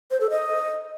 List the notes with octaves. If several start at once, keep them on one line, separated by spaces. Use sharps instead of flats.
C5
A4
D#5